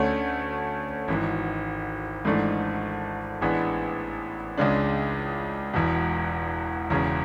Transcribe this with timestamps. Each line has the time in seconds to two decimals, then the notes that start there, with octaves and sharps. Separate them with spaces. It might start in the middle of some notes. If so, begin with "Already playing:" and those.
Already playing: D2 D3 A3 C#4
1.08 G#1 G#2 E3
2.25 G#1 G#2 E3 A3 D4
3.41 A1 A2 G#3 B3 D4
4.57 C#2 C#3 G#3 D4
5.74 E1 E2 B2
6.90 E1 E2 C#3